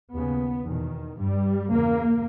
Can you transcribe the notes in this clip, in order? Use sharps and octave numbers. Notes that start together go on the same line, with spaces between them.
D#2 C#3 B3
E2 D#3
B2
G2 G3
E2 C#3 A#3